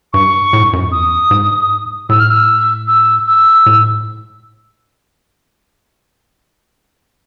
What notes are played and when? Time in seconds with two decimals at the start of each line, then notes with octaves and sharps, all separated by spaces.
0.13 G2 C#6
0.53 A2
0.63 G2
0.73 F#2
0.83 F2
0.92 E2 D#6
1.31 G#2
2.09 A2 E6
2.20 F6
2.30 E6
2.88 E6
3.27 E6
3.66 A2